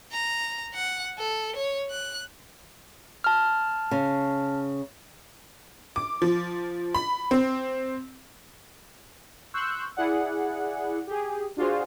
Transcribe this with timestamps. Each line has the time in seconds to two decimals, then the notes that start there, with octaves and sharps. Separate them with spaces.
0.12 A#5
0.74 F#5
1.18 A4
1.56 C#5
1.90 F#6
3.24 A5 F6
3.91 C#3
5.96 D6
6.22 F3
6.95 B5
7.31 C4
9.54 C6 C#6 E6 F#6 G6
9.97 E4 G#4 D5 F#5
11.07 G4 G#4
11.57 D4 F4 F#4 G#4 C5